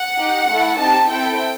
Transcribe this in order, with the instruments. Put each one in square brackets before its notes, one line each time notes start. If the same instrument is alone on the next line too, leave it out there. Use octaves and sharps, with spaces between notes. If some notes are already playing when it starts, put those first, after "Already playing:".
Already playing: [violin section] F#5
D#4 G4
A3 E4 A4
C4 D#4 G4 A5
C4 E4 A4 G5